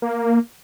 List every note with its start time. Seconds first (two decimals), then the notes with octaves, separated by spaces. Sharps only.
0.02 A#3